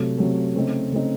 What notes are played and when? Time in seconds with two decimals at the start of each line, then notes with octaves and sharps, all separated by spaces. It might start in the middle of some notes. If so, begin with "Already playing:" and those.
Already playing: C3 F#3 A3
0.18 C3 F#3 A3
0.55 C#3 A3 C4 D#4
0.91 C#3 A3 C4 D#4